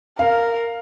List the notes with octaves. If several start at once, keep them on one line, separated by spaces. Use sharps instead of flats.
A#4 F5